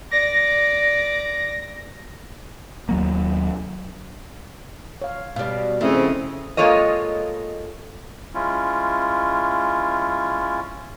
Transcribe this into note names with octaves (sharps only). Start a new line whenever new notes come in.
D5 A#6
D#2 F#3 A#3
C#5 F5
B2 G3 F5
C#3 F3 A3 C4 E4 D#5 E5
G#3 A#3 F4 A4 C#5 D#5
G#3 C#4 E4 F4